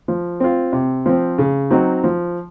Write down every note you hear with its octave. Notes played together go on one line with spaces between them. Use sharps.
F3
C4 F4
C3
F3 C4
C#3
F#3 C4 D#4 F#4
F3